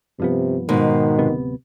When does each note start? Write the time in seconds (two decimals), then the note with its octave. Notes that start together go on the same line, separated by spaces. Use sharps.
0.20 G2 C3 F3 B3
0.69 G#2 B2 D#3
1.18 D1 C3 B3